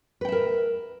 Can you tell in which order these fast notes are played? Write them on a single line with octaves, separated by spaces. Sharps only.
B4 G5 E5 A#4